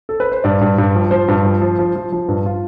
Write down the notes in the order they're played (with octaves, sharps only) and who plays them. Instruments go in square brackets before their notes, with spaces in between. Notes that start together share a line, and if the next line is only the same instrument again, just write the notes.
[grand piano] A4
B4
C5
G2 D5
G2
G2
F3
F3 C5
G2
F3
F3
F3
F3
F3
G2
F4